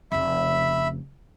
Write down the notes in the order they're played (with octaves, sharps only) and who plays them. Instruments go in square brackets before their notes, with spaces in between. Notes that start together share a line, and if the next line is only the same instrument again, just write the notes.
[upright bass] F1 C#3 [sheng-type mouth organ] E5 B5